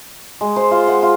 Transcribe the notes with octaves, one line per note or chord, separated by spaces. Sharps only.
G#3
C5
F4
F#5
F4